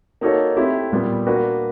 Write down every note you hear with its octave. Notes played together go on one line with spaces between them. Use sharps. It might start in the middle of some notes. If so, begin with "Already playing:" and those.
A#3 D#4 F#4 A4 C#5
A3 C4 E4 G4
A#2 G3 B3
A#3 D4 F#4 B4